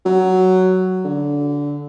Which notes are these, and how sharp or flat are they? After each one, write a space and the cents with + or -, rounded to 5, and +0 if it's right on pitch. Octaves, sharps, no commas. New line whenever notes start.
F#3 +10
D3 -20